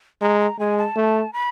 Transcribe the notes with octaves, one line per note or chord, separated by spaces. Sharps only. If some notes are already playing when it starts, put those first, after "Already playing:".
G#3 A#5
A#5
G#3 G#5
A5
A3
B5